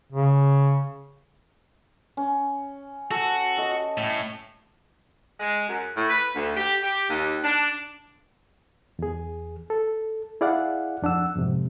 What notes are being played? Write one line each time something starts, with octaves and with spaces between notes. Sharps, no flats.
C#3
C#4
F#4 A4
A4 D#5
A2
G#3
F#2
A2
B4
D2
G4
G4
D#2
D4
E2 G#4
A4
E4 G#4 D5 F5 F#5
F2 D4 F#5 E6
F2 G#2 C3